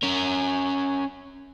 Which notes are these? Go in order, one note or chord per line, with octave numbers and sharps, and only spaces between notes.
C#4 A#4